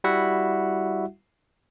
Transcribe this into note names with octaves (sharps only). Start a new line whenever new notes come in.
G3 E4 F#4 E5 F#5